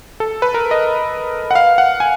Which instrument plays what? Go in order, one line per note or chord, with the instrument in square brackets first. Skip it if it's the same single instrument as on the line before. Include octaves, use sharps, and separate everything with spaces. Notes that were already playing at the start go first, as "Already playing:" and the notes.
[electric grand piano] A4
B4
A#4
D#5
F#5
F5
F#5
G#5